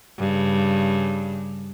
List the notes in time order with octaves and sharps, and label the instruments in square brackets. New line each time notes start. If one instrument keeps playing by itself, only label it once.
[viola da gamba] G2 C#3